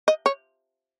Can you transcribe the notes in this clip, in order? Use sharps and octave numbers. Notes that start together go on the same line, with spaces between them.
D#5
C#5